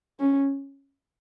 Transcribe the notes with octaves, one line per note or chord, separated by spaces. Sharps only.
C#4